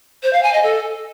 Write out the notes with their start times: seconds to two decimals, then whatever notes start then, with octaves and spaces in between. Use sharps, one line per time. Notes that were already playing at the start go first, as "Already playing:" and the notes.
0.23 C5
0.33 F5
0.43 G#5
0.53 D#5
0.63 A4